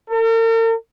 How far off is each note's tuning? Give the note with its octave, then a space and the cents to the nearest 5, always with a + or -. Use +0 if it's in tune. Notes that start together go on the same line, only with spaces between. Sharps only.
A#4 -45